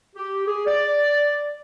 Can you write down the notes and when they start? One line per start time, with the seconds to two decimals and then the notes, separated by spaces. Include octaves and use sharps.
0.16 G4
0.45 G#4
0.67 D5